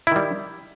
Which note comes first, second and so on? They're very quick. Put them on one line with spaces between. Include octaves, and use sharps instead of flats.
E4 D#3 G3